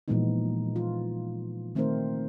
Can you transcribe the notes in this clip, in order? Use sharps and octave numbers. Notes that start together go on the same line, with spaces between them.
A#2 E3 F3 G#3 B3 D#4
F4
D#3 A3 C4 D#4 A#4 C5